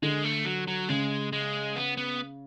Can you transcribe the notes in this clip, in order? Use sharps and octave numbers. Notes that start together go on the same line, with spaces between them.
D3 G#3
A3
F#3
F#3
C#3 G#3
G#3
B3
B3